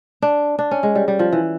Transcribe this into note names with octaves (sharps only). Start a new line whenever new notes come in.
D4
D4
C#4
G#3
G3
G3
F3
E3